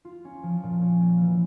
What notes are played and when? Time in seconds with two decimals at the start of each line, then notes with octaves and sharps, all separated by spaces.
0.05 F4
0.25 C#4
0.43 F3
0.63 A#2
0.81 C#4
1.01 A#3
1.21 E3